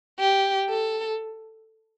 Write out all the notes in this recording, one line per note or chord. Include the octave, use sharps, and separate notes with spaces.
G4
A4